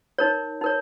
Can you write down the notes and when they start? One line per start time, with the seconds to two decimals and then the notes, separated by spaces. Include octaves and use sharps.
0.18 D#4 A#4 C#5
0.61 D#4 A#4 C#5